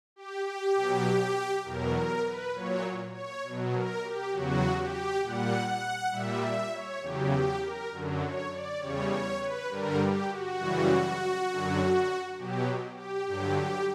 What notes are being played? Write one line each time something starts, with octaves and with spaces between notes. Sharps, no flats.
G4
G4
B2 F#3
E2 B2 F#3 A#4
A#4
B4
A#2 F#3 C#5
C#5
B2
F#3
A#4
G4
E2 C#3 F#3 F#4
G4
A#2 G3 F#5
F#5
A#2 G3 E5
E5
C#5
E2 C#3 F#3 G4
G4
A#4
F#2 D3 F#3
C#5
D5
E2 C#3 G3 C#5
C#5
B4
G2 D3 G3 A#4
G4
F#4
F#2 C#3 E3 G3
F#2 D3 F#3
B2 F#3 G4
G4
G2 D3 F#3 G4
G4